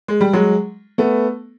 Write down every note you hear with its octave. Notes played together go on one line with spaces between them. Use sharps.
G#3
G3
F#3 G#3
A3 B3